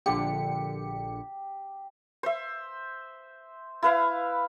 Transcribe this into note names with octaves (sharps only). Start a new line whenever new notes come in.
A#1 D3 G4 C#7
C5 E5
E4 B4 F5